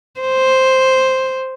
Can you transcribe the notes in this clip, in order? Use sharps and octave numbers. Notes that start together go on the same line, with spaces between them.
C5